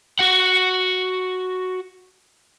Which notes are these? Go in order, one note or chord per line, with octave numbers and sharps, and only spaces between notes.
F#4 F#5